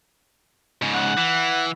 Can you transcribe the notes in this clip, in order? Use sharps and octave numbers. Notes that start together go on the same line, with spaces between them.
G#2 C#3
F#5
E3